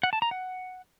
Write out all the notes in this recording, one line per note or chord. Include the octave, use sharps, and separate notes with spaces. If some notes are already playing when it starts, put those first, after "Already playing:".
F#5
A5
A#5
F#5